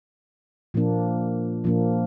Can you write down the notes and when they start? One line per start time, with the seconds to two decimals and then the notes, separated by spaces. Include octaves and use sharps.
0.74 A#2 F3 A#3 D4
1.64 A#2 F3 A#3 D4